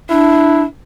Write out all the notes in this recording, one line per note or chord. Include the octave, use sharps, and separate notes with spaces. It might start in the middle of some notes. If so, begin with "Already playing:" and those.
D4 E4